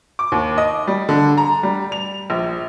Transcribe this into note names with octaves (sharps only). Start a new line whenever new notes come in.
D6
D#2
D#5
G3
D3
A#5
G3
F7
A#1